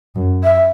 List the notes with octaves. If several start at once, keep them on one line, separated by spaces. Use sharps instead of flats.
F#2
E5